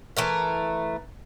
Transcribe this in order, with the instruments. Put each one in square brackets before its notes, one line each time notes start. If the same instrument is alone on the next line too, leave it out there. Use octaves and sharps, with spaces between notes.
[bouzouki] E3 A3 A#4